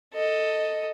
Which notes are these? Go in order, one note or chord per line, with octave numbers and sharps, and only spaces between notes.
A4 D#5